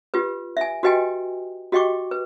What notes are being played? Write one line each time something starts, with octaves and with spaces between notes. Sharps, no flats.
F4 G4 B4
E5 G#5
F#4 G4 B4 D#5 G5 G#5
F#4 G4 D#5 G5 C#6 D6
B4